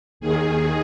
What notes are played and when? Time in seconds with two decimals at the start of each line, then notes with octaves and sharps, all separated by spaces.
0.20 D#2 D#3 G#4